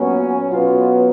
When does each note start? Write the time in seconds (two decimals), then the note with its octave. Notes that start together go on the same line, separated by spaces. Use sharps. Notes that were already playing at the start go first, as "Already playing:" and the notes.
Already playing: A#2 F#3 B3 C#4
0.51 B2 F#3 B3 F4